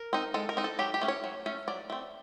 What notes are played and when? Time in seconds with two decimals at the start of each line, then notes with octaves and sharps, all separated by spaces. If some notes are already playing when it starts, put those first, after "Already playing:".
Already playing: A#4
0.13 C4 D#4
0.34 G#3 A4
0.49 A#4
0.57 C4 D#4
0.64 A4
0.79 F#3 G4
0.94 G4
1.01 A3 C#4
1.08 C#5
1.24 F#3
1.46 A3 C#4
1.68 F#3 D5
1.90 A3 C4